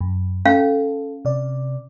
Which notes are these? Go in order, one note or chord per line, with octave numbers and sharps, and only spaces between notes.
F#2
C#4 A4 F5
C3 D5